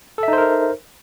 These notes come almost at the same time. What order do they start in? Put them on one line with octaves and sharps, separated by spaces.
A4 E5 D#4 C5 A#4